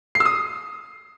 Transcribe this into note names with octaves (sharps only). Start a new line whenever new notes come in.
C7
E6
D#6